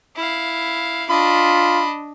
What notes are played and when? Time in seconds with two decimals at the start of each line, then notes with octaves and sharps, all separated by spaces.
0.16 E4 F5
1.10 D4 F4 D#5 B5